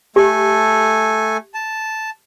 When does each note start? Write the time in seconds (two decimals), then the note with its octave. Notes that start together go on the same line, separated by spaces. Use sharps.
0.16 A3 G4 A4 G#5
1.54 A5